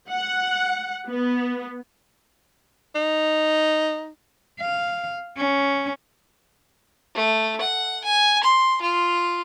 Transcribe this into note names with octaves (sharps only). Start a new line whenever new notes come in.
F#5
B3
D#4
F5
C#4
A3
F#5
G#5
C6
F4